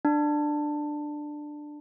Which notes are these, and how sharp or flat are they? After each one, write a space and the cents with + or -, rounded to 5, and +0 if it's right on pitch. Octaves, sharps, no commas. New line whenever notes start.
D4 +15